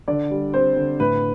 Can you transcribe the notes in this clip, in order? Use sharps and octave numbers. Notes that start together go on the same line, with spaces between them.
D3 D5
G3
C4 C5
D3
A2 B4